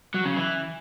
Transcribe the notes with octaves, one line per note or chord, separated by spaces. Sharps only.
F#3
C#3
E3